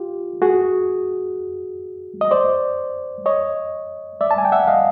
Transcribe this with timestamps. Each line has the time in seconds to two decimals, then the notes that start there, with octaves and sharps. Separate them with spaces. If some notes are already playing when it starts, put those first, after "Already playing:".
Already playing: F4 G4
0.42 F#4 G#4
2.21 D#5
2.31 C5 D5
3.26 C#5 D#5
4.21 D5 E5
4.31 A5
4.38 G#5
4.45 G5
4.52 E5 F#5
4.68 D#5 F5